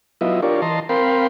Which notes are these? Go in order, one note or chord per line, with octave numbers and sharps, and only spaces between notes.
F#3 B3 E4 F4 D#5 E5
D4 F4 G4 A#4 C#5 D5
E3 D#5 A5 A#5 C6
C4 A#4 F5 G5 B5 C6